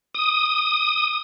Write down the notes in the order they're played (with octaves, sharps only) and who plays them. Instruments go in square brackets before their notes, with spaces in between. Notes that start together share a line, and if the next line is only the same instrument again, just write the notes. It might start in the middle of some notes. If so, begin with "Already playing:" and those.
[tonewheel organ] D#6